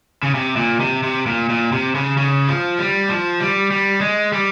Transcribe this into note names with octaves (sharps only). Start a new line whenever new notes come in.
C#3
C3
A#2
C3
C3
A#2
A#2
C3
C#3
C#3
F3
G3
F3
G3
G3
G#3
G3